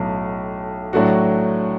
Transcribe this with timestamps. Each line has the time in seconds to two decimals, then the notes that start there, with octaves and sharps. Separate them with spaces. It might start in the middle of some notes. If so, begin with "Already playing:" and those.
Already playing: B1 A2 F#3
0.93 A2 F#3 A3 D4 F#4